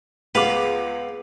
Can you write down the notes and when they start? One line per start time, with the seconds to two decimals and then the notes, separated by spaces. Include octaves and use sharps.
0.35 C#2 G#3 B3 B4 F5 D6